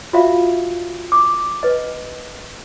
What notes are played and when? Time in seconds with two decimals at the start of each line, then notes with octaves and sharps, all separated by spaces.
0.13 F4 F#4 E5 F5
1.12 D6
1.63 B4 D#5